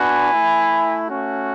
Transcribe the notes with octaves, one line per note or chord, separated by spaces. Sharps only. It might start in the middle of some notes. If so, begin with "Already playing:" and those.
Already playing: B3 D4 F#4 G#5 B5
A3 E4
A3 C#4 F#4